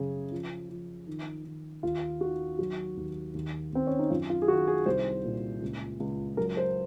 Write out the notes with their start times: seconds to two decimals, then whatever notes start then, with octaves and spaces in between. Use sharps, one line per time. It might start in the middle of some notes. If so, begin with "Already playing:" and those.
Already playing: F#2 C#3 G#4
0.32 F3
0.70 F3
1.07 D#3
1.45 D#3
1.83 D#2 F4
2.21 D#3 F#4
2.59 F#3 F#4
2.97 D#2
3.34 D#2
3.73 D#2 C4
3.87 C#4
3.99 D#4
4.10 F#2 F4
4.30 F4
4.42 G#4
4.48 D#3 F#4
4.68 G#4
4.86 C2 C5
5.24 A#2
5.62 C#2
6.00 C#2
6.37 F#3 A#4
6.57 C5